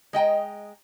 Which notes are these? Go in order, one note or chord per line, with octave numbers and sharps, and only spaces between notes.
G#3 D#5 G5 A#5